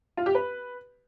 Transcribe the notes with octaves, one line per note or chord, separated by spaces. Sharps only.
F4
G4
B4